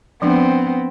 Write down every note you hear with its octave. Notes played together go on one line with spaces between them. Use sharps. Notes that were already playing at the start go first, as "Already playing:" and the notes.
F3 B3 C4 D4